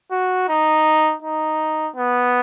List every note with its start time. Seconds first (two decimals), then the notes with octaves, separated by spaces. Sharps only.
0.11 F#4
0.49 D#4
1.22 D#4
1.96 B3